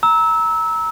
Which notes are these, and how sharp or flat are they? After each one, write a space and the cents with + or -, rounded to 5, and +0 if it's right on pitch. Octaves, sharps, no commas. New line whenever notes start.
A#5 +5 E6 -20